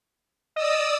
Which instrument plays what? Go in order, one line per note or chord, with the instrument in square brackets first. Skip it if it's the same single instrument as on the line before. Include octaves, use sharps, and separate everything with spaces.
[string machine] D5 D#6 E6 [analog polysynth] D#5